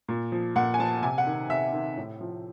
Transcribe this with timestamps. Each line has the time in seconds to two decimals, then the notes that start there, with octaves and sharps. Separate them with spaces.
0.08 A#2
0.32 F3
0.55 A#2 F#5
0.74 G#5
0.79 F3 A5
1.02 C3 G#5
1.18 F#5
1.27 D#3
1.50 C3 E5
1.73 D#3
1.97 A2
2.21 F3